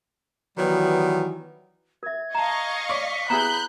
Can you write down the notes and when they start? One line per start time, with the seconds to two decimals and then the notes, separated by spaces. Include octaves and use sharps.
0.57 D#3 E3 F#3 G3 B3
2.03 A#4 E5 G#6
2.35 D#5 F5 A5 A#5 C#6
2.90 C#5 D5 B6
3.30 B3 E4 G#4 A#5 B5 F#6 G6